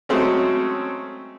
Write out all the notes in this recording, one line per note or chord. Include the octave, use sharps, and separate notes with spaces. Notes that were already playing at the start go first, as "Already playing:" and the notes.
F#3 G#3 A3 C4 C#4